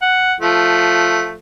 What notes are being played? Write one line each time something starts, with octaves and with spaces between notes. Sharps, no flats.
F#5
F3 A3